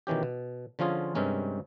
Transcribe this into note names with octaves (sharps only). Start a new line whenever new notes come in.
B2 D#3 E3 C#4 G4
B2
D3 F3 C#4 F4 G#4
G2 C3 G#3 C#4 A#4